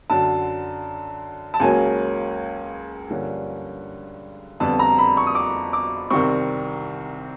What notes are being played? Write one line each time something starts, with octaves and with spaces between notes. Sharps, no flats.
F#2 D3 F#3 A5
A5
C#2 C#3 F#3 A#3 C#4 G#5
G2 D3 F3 A#3 C#4
F2 D3 G3 B3 A5
A#5
B5
C#6
D#6
D6
D6
C2 C3 D#3 G3 C4 C#6